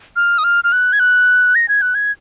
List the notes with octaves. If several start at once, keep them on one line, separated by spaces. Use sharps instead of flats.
F6
D#6
F6
F6
F#6
G#6
F#6
A#6
G#6
F#6
G#6